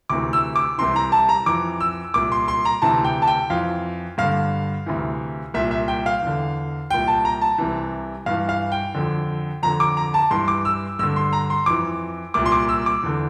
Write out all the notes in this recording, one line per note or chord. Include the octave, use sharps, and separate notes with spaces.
D2 C3 E3 D6
E6
D6
C2 C3 E3 C6
A#5
A5
A#5
F2 E3 D6
E6
C2 A#2 D6
C6
C6
A#5
D2 C3 E3 A5
G5
A5
G5
F2 E3 F5
G2 D3 F5
D2 C3 E3
C2 A#2 E5
E5
G5
F5
E2 D3
C2 A#2 G5
A5
A#5
A5
C2 C3 E3
G2 E3 F5
F5
G5
F2 D3
F2 D3 A#5
D6
A#5
A5
G2 E3 C6
D6
E6
G2 D3 E6
C6
A#5
C6
F2 E3 D6
C2 A#2 D6
C6
D6
E6
D6
E2 D3